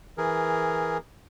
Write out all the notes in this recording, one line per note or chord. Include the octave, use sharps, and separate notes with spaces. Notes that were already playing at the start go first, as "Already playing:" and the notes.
E3 G#4 A#4